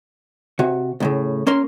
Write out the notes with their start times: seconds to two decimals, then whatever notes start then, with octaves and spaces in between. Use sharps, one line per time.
0.59 C3 F#4
1.00 C2 A2 C#3
1.47 A#3 C#4 A#4 C6